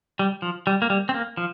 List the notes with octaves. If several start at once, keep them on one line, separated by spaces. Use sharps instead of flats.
G3
F3
G3
A#3
G3
C4
A#3
F3